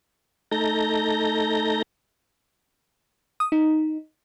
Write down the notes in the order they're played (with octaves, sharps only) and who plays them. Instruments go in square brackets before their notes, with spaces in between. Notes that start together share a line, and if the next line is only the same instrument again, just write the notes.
[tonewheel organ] A3 D#4 A4 A#5 G6 A#6
[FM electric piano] D#6
D#4